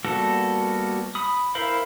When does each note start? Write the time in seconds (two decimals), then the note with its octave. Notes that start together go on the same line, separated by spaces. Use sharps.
0.05 G3 A#3 B3 F#4 A4
1.15 B5 D#6
1.55 E4 A#4 C5 F5 B5